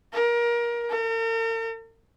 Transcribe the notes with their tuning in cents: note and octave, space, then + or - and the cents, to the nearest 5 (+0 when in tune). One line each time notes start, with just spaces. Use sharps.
A#4 +25
A#4 -45